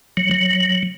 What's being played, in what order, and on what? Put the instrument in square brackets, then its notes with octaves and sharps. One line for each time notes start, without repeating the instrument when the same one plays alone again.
[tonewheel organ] F#3
F#3